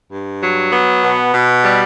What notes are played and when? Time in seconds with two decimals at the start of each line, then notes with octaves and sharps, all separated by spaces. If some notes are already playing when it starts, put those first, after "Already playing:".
0.12 G2
0.42 F#3
0.72 B3
1.02 B2
1.33 B2
1.64 G3